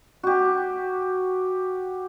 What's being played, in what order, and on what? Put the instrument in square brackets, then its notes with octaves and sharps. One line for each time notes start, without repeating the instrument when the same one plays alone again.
[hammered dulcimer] F#4 G4